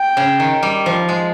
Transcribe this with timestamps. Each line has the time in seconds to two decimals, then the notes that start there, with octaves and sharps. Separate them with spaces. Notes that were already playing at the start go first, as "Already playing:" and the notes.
Already playing: G5
0.17 C#3
0.40 D#3
0.63 G3
0.86 F3
1.09 G#3